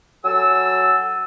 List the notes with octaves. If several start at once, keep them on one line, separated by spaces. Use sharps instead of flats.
F#3 A4 G#5 E6